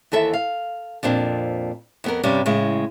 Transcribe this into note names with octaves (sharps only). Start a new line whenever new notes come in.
D#2 E3 A4 E5
F5
F2 A#2 C4 D4
F2 B3 A#4
G2 C3 G3 C#4
A2 C#3 G#3